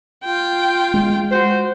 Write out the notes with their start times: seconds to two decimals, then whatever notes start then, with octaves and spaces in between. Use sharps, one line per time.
0.24 F4 G5
0.94 G#3
1.31 F#4 C5